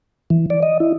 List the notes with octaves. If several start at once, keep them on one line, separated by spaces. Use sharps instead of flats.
E3
D5
D#5
E4